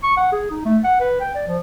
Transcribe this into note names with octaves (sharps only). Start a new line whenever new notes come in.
C#6
F#5
G#4
D#4
A3
F#5
B4
G5
D5
F3